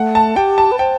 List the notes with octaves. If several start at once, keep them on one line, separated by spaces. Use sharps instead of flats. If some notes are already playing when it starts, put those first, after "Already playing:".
Already playing: A3 F#5
A5
G4 G5
A5
B4
C5 G5